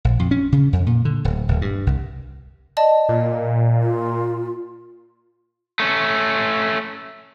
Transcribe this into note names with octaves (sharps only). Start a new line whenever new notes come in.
A#1
F2
C#4
C#3
F2
A#2
D3
D1
D1
G2
C2
D5 D#5 A5
A#2
F4
A3 C#4